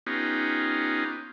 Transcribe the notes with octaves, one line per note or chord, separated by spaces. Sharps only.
B3 C#4 D#4 F4 G4